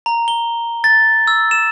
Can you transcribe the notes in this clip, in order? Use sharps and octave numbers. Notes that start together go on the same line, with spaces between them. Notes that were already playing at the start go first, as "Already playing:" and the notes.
A#5
G7
A6
E6
E7